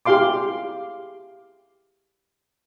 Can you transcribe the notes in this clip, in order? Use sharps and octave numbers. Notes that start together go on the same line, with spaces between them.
E4 G4 G#4 F5 C6 D6